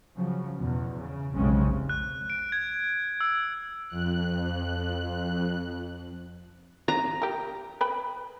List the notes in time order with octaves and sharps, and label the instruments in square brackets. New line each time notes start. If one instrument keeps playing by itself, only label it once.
[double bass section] C#3 F3 F#3
E2 B2
C#3
F1 B1 C#3 G#3 C4 C#4
[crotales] F#6
D7
G#6
E6
[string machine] F2 F#6
[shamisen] D4 [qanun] A#5
[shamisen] G4 A#4
B4 G5 B5